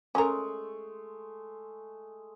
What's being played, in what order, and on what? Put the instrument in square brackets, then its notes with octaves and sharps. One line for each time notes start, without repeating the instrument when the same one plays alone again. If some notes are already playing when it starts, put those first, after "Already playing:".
[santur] G#3 A3 [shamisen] C#4 A#4